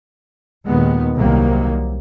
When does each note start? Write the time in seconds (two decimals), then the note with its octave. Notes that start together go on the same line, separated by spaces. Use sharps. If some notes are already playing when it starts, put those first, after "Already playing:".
0.65 D#2 A#2 D#3 G#3 B3
1.17 C2 C3 D#3 F#3 A#3